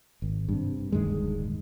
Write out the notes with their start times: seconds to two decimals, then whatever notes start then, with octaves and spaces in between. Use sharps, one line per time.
0.22 G#1
0.49 G2 C3
0.92 D1 G2 D#3 G#3